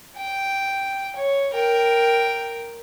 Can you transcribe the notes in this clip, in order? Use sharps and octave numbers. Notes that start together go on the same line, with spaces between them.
G5
C#5
A#4 G5